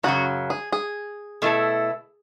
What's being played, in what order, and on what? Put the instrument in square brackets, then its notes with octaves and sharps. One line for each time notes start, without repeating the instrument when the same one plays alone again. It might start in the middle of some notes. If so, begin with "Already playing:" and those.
[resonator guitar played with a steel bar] F#2 C#3 F#3 [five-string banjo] F#4
[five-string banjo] G#4
G#4
[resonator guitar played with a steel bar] B2 A3 E4 A4